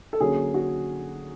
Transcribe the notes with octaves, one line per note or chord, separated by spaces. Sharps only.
A4
D3 F#3 A#3 C#4 G#4
F#4